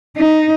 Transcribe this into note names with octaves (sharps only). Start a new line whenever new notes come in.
D#4